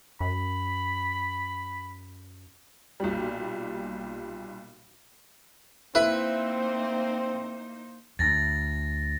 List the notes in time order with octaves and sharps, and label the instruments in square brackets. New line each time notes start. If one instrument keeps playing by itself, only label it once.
[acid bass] F#2 [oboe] B5
[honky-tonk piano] B1 A#2 G3
[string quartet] A#3 D#4 C5 [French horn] C4 [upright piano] E4 E5 [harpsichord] B4
[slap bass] D2 [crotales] A6 A#6